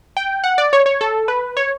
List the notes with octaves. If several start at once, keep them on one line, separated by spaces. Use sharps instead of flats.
G5
F#5
D5
C#5
C#5
A4
B4
C#5